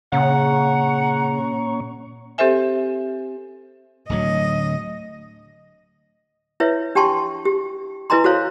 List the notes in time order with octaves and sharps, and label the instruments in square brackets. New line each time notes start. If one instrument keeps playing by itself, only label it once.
[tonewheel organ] A#2 C#4 C#6 [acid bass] C#3 [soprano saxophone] F#5 [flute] A#5
[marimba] C4 G4 A4 C5 E5 G#5
[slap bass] D1 D2 F#3 [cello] D#5
[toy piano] E4 B4 C#5 E5
D4 G4 G5 A5 C6 C#6
G4
E4 B4 D#5 G#5 A#5 C6
F#4 A4 C5 C#5 F5